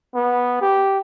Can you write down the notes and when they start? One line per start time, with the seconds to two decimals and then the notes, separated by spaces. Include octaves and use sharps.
0.15 B3
0.61 G4